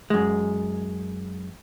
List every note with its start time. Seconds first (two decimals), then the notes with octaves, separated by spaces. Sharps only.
0.10 F#2 G#3